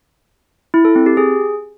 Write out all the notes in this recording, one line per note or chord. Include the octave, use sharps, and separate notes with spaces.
E4
A4
C4
G4
G#4